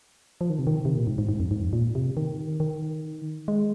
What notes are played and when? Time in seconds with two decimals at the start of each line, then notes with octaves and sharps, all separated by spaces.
0.41 F3
0.50 D#3
0.59 C3
0.67 D#3
0.85 C3
0.96 A#2
1.07 G#2
1.18 G#2
1.29 G#2
1.40 F2
1.51 G#2
1.61 F2
1.73 A#2
1.95 C3
2.17 D#3
2.60 D#3
3.48 G#3